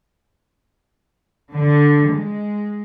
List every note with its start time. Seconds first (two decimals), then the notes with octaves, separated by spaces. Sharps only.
1.53 D3
2.09 G#3